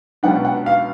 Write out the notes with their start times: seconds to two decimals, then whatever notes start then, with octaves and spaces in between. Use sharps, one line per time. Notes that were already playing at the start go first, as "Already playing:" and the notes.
0.23 C#2 B2 F#3 B3 D4 F#5
0.45 F#5
0.66 F5